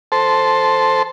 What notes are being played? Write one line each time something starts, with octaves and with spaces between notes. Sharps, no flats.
A4 C5